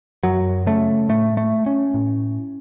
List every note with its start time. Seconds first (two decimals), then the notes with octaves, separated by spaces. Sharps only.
0.23 F#2 F#3
0.66 C#3 A3
1.09 A2 A3
1.37 A3
1.66 C#4
1.94 A2